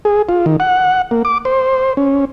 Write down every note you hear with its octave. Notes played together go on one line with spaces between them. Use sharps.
G#4
F4
D#3
F#5
A#3
D6
C5
C#4